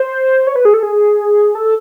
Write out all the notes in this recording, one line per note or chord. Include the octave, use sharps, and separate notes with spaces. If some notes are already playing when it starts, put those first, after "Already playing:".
Already playing: C5
C#5
B4
G#4
A4
G#4
A4